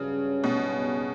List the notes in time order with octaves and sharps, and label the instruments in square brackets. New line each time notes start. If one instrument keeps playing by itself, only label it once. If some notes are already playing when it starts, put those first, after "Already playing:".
Already playing: [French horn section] G2 F#3 C#4 [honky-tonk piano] C#3
[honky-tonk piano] B2